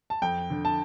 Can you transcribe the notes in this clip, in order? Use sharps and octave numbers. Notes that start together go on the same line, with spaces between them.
A5
F2 G5
D3
A5